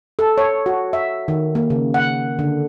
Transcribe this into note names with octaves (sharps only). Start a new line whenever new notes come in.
A4
C#5
F#4
E5
D#3
A#3
C#3
F#5
D3